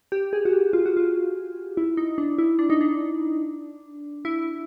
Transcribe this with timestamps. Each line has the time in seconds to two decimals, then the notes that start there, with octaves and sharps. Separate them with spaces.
0.12 G4
0.33 G#4
0.45 F#4
0.53 G4
0.73 F4
0.86 F#4
0.97 F4
1.77 E4
1.97 D#4
2.18 D4
2.38 E4
2.59 D4
2.70 D#4
2.81 D4
4.25 E4